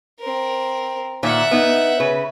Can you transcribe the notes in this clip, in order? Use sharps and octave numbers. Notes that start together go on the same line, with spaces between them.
C4 A#4
A#2 D#3 E5 F#5
B3 D#4
C#3 B4